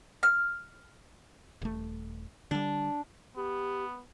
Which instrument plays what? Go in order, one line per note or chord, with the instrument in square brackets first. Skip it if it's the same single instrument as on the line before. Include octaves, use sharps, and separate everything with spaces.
[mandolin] F6
[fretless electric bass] D#1 A3
[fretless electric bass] D3 G3 [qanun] D4
[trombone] B3 [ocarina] G4